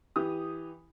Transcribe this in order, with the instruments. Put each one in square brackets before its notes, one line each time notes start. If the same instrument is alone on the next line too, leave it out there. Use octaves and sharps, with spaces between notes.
[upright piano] E3 G4 D#6